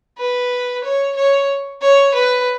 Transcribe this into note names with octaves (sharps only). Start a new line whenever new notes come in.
B4
C#5
C#5
C#5
B4